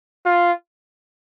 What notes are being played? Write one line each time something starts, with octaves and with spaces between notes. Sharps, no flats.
F4